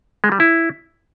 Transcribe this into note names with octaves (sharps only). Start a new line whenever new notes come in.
G#3
G3
E4